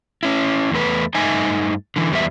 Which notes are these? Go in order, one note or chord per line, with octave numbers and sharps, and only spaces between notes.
C#4 E4
E2 A3 B4
G2 A3 D#4 D#5 E5 G#5
D3 E3
E2 G3 B3 E5